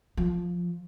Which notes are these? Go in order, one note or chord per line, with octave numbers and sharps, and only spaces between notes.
F3